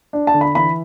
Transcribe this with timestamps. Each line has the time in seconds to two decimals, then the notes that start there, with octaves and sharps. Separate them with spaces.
0.13 D4
0.27 A5
0.34 D3
0.41 B5
0.55 E3 B5